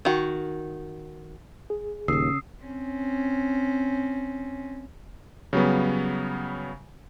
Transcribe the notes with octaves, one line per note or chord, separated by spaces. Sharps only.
D#3 F#4
G#4
D#1 D#2 C#3 D#6 E6 C7
C4 C#4
C#3 F#3 G3 B3